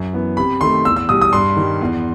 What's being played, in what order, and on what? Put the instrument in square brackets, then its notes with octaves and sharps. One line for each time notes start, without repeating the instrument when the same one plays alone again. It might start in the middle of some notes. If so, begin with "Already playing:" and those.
Already playing: [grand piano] F#2
E3 B3
C3 B5
D#3 A3 C6
E2 E6
E6
B2 G3 D#6
D#6
G2 C6
D#3 G3
E2